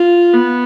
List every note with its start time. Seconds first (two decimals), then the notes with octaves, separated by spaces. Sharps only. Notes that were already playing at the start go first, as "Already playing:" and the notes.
Already playing: F4
0.34 B3